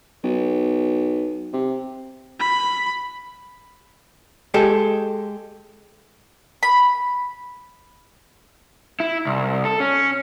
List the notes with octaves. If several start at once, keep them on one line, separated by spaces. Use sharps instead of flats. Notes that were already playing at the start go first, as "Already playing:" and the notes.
B1
C3
B5
G#3 G4 A4
B5
E4
C2
A4
C#4